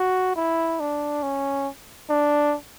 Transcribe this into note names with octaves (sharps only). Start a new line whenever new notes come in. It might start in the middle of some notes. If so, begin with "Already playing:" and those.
Already playing: F#4
E4
D4
C#4
D4